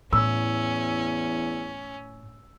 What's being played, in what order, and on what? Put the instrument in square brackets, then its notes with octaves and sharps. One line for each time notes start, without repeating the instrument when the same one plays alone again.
[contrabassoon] E2 [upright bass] A2 [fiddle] C#4 [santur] E6